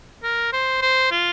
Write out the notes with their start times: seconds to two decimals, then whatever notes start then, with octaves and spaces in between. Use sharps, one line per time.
0.23 A#4
0.53 C5
0.82 C5
1.11 F4